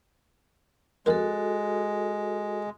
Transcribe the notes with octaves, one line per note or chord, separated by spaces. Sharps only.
F2 G#3 A#3 F#4 A4 A#4